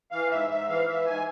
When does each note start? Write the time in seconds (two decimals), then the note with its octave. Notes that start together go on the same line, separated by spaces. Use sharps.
0.11 E3 F5
0.31 G#2 E5
0.49 G#2 E5
0.68 E3 F5
0.87 E3 E5
1.06 G#2 G#5